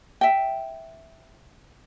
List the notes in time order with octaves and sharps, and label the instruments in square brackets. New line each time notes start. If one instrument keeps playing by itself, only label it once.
[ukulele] E5 G5